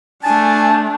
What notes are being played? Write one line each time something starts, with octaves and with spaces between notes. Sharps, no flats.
A3 D4 G#5 A5